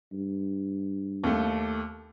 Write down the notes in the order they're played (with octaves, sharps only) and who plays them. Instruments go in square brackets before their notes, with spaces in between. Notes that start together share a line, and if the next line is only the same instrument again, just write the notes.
[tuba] G2
[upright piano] D#2 A3